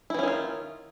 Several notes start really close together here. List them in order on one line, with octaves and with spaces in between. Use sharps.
E4 E3 C#4 D#3 F4